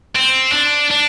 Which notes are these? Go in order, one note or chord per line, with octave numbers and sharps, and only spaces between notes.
C4
D4
D4